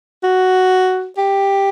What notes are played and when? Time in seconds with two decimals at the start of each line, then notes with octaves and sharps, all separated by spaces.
0.23 F#4
1.18 G4